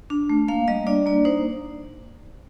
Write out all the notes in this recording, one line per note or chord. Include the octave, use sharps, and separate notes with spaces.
D4
A3
A#3 F5
G3 D#5
D4 D5
A#3 D5
D#4 C5